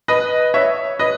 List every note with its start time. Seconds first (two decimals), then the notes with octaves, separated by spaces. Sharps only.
0.08 B4 D#5
0.54 C#5 E5
0.99 B4 D#5